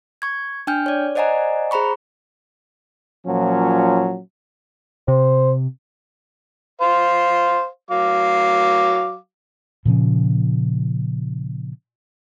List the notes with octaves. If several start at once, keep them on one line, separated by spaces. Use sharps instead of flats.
C#6 G#6
D4 G5 G#5 F6 G6
C#5 D5
C5 D5 D#5 F#5 G#5 A#5
G#4 C5 A#5 B5 C#6
A#2 F3 F#3 C#4
C3 C5
C5 F5
F#3 F5 D6
A#2 C#3 F3 C#4